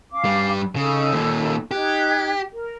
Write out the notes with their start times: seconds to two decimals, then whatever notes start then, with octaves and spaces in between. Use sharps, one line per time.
0.11 C#4 F5 D6
0.25 G2 G3
0.76 C#3 D#4 A4
1.12 D#2 A#2
1.71 D#4 G4 F#6 G#6
2.52 A#4